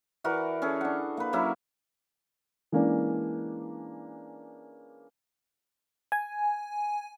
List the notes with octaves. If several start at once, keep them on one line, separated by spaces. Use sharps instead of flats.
E3 F#4 A#4 D5
C#4 G#4 A4
D4 F#5
A#3 B4
F#3 A#3 C#4 E4
E3 G#3 A#3 C#4 D4
G#5